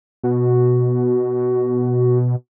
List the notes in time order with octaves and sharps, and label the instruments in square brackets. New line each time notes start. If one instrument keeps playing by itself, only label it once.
[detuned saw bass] B2 [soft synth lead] F#4